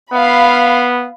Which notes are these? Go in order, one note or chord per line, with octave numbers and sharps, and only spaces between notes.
B3 F5 B5